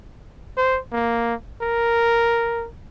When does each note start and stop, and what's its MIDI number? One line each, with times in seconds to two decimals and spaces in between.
0.57 0.80 72
0.92 1.35 58
1.62 2.66 70